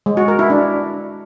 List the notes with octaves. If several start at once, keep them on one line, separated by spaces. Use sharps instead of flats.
G#3
F#4
A#4
E4
D4